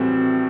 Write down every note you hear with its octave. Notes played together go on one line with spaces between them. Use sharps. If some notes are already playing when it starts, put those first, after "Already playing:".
Already playing: A2 E3 G3 C4 F#4